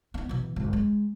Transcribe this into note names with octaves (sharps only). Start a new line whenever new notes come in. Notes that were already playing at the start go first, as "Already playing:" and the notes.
B3 D#4
B2 E3
G#1 D2
G#3